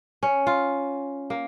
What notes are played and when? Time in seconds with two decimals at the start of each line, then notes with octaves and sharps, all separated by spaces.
0.23 C#4
0.47 F4
1.30 A#3